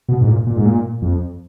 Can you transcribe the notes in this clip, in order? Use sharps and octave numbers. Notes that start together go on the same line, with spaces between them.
B2
G#2
A#2
A#2
G#2
A#2
F2